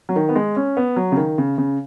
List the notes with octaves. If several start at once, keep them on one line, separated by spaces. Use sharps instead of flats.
F#3
D#3
B3
G#3
C#4
B3
F#3
C#3
D#3
C#3
C#3